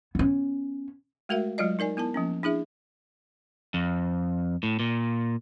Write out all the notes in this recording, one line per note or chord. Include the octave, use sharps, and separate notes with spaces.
B3 C#4
G#3 A3 F#4 A#4 E5 F5
F#3 G#3 F4 D5 D#5
D#4 A#4 D5 G#5
B3 E4 A#4 A5
F3 A#3 C#4
D4 E4 G#4 E5
F2
A2
A#2